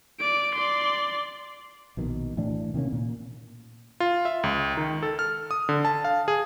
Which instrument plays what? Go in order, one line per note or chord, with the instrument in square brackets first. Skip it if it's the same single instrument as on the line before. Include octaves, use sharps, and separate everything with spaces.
[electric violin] D5 D7
D5 C6
[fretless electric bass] A#1 B2 D#3
A2 E3 D4
C3 D#3 A#3 C#4
A#2
[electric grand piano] F4
E5
C#2
D#3
A4
F6
D#6
D3
A5
F5
G#4